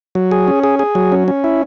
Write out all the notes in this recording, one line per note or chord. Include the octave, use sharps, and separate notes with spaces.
F#3
G#4
C#4
G#4
G#4
F#3
C#4
C#4
E4